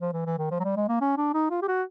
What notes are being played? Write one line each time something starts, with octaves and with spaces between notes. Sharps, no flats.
F3
E3
E3
D#3
F3
F#3
G3
G#3
A#3
C#4
D4
D#4
F4
G4
F#4